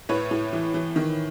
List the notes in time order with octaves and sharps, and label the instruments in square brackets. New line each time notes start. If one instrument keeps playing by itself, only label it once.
[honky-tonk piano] A2 B4 C#5
A2
E3
E3
D#3